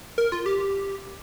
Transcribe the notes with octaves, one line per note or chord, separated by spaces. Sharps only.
A#4
F4
G4